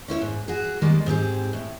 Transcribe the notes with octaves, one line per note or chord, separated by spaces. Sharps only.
C#4 E4 C5 C#5
G#2
F#4 G#4
D#3 G3 G#3 A#3
G#2 C4 G4 G#4
A2